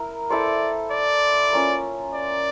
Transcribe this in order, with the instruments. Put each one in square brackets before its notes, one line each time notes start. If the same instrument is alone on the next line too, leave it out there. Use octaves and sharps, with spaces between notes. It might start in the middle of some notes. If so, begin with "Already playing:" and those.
Already playing: [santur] E4 A#4
[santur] E4 A4 C5 [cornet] D5
[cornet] D5
[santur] A#3 C#4 F4
[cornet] D5